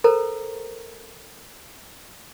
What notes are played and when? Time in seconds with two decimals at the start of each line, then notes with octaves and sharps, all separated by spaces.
0.04 A4 A#4 C5 A#5